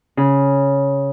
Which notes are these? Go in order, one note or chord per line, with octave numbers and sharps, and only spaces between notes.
C#3